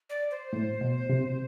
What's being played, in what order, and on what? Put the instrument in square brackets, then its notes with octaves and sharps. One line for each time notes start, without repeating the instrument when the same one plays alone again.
[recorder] D5
C5
[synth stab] A2
B2
C3